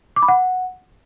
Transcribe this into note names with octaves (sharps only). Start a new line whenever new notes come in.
D6
B5
F#5